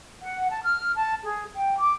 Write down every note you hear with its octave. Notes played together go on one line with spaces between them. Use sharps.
F#5
A5
F6
A5
G#4
G5
D6